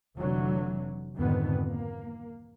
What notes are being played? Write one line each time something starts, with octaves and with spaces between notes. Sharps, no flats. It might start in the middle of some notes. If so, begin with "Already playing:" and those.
F1 D3 E3 F#3
C2 F2 G#2 D3 D#3 B3
A#3